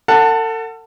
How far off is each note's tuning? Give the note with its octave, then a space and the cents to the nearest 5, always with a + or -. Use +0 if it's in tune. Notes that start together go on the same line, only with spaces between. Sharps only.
A4 +40 F#5 +0 A5 +20